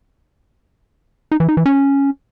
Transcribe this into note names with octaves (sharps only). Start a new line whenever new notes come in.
D#4
E3
D#4
E3
C#4